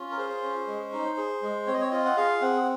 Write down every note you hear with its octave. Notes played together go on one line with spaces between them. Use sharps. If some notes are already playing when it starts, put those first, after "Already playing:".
Already playing: C#4 F4
A#4
G#4 C5
C#4
G#3
D#4
G#4
G#3
C4 C#5
D#5
C#5
F4 D#5
F#5
G#4 F5
C4 F#5